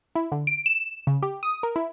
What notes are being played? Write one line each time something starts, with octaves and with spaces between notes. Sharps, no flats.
E4
D3
D7
E7
C#3
G4
D#6
A#4
E4